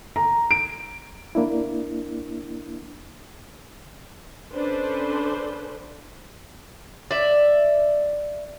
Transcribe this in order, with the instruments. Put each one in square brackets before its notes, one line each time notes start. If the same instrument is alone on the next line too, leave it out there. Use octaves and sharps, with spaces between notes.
[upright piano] A#5
D7
[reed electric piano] A#3 D4 E4
[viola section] C#4 D4 A4 B4 C5
[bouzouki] D5 E5